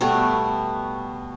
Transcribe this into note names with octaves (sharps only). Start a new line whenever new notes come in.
B2 G3 A3 B3